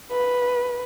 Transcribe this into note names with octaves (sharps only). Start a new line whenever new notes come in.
B4